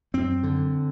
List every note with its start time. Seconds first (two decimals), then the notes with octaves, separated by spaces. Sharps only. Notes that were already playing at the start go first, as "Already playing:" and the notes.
0.14 F#2 C4
0.43 D3